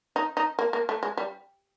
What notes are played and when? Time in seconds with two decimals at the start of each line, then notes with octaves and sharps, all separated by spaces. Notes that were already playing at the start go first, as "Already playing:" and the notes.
0.16 D#4
0.37 D#4
0.59 A#3
0.73 A#3
0.89 A3
1.03 G#3
1.17 G3